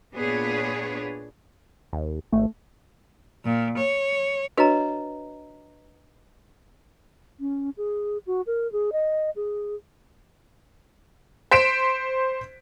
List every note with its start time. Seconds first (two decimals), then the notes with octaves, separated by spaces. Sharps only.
0.14 A#2 B3 D4 G#4 B4 C#5
1.93 D#2
2.32 G#1 A3
3.44 A#2
3.76 C#5
4.57 D4 F#4 B4 C#5 D#5 A#5
7.40 C#4
7.77 G#4
8.27 F#4
8.47 A#4
8.72 G#4
8.92 D#5
9.36 G#4
11.51 C5 B6 D7 E7